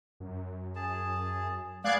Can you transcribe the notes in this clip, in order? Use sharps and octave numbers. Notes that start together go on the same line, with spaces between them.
F#2
G#4 A5
G#3 B3 G#4 D5 F5 F#6 G#6